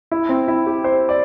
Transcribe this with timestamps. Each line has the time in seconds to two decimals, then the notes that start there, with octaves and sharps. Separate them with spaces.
0.11 E4
0.29 C4
0.48 E4
0.66 G4
0.84 C5
1.09 D5